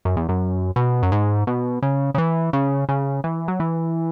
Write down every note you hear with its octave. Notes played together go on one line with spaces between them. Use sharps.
F#2
E2
F#2
B2
F#2
G#2
B2
C#3
C#3
E3
C#3
C#3
E3
F#3
E3